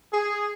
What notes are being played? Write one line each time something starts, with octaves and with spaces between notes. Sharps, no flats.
G#4